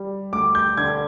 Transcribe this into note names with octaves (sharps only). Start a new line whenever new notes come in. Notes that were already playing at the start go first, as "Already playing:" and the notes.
Already playing: G3
D2 D6
G6
D3 G#6